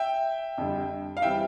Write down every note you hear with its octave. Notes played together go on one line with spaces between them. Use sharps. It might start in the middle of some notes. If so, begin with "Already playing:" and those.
Already playing: E5 G5
F2 D3 G3
F5
E3 G3 C4 E5 G5